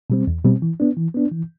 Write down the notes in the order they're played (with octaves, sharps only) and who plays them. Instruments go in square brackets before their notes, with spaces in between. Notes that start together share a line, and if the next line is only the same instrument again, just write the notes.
[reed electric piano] B2 G3 C4
E2
B2 G3 C4
E3
B3 D4
E3
B3 D4
E3